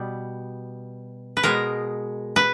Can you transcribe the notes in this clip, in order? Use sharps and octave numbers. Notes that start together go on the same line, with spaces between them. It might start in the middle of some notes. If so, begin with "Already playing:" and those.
Already playing: B2 G3
B4
B2 G#3 A#4
B4